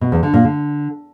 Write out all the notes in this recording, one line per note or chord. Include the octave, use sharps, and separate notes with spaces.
B2
E2
D3
A#2
D3